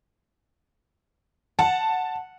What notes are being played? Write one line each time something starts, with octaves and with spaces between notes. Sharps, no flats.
F#5 A5